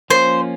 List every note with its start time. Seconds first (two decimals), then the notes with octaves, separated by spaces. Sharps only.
0.10 F3 A#3 C#4 F4 C5